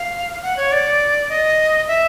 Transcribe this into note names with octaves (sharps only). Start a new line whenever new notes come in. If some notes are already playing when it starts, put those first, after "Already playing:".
Already playing: F5
F#5
C#5
D5
D#5
E5